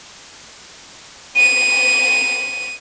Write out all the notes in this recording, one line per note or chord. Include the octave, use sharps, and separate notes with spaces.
D#7